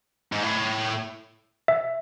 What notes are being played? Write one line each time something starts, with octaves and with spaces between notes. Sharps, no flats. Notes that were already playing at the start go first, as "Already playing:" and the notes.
G#2
A2
E5